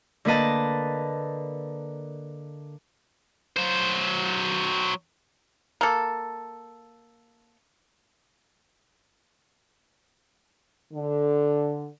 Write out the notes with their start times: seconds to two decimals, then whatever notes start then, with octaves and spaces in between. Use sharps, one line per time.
0.25 D3 A#3 B4 D#5 A5
3.57 F#3 C5
5.81 A#3 A4
10.93 D3